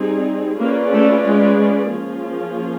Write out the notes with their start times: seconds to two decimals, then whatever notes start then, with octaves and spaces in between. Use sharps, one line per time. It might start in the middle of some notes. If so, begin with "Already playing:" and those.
Already playing: G3 C4 D#4 G#4
0.60 A#3 C#4 F4 G#4 B4 D5
0.93 A3
1.26 G#3
1.90 F3 A#3 C#4 F4 G#4